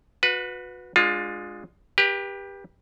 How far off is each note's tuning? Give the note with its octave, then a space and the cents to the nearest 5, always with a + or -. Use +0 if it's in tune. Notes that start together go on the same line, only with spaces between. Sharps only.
F#4 -30 B4 +0
G#3 +0 D4 +15 F4 +25
G4 +15 B4 -30